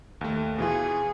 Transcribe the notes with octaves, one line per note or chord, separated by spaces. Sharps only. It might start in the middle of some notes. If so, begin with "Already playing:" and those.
D#2 A3
B2 E3 F4 G#4